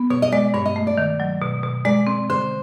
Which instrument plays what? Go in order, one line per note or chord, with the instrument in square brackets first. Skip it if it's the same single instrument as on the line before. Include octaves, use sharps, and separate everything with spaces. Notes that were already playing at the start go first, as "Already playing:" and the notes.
Already playing: [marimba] B3
[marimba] B2 [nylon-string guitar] C#5
[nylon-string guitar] D#5
[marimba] G#3 [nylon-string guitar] D5
[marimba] G2 [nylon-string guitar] C#5
[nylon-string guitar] D#5
[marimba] A3
[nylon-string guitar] D5
[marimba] D#3
F#3
B2
B2
[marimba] G#3 [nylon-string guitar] D5
[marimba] C4
[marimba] D3 [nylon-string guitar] C5